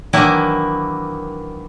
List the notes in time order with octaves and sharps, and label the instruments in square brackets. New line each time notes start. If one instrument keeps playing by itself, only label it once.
[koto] D#3 E3 F#3 A#3 D4 E4